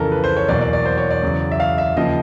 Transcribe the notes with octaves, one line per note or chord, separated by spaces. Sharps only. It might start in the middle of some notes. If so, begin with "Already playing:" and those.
Already playing: F2 C#3 E3 A4 A#4
B4
C5
C#5
E2 B2 F#3 A#3 D5
D5
D5
C5
C#5
D5
E2 C#3 F#3
E5
F5
E5
D#2 C#3 F3 D#5